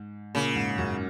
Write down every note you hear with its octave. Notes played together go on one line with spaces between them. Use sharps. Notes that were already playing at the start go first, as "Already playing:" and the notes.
Already playing: G#2
A#2 C#3
G#2
F#2